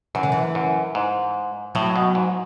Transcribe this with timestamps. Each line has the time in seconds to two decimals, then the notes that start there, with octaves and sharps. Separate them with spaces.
0.15 F#2 E3
0.23 D3
0.32 E3
0.55 F#2
0.95 G#2
1.75 A2 F#3
1.96 B2
2.15 G#2